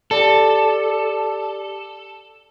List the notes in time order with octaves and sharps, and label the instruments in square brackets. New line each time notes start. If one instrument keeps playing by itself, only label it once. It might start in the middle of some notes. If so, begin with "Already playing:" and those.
[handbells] G4 D5 A5 [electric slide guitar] A4